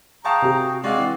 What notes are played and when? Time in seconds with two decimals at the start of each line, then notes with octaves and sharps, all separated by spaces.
0.25 G#4 F5 G5 A5 A#5 C#6
0.42 C3 G4
0.58 F#4
0.84 G#3 C4 F#4 D5 F5
0.98 E3